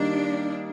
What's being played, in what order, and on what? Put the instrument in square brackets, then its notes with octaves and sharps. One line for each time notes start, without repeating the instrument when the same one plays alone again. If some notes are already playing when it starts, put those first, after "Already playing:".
Already playing: [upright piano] D#3 G3 A#3 D#4 [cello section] D4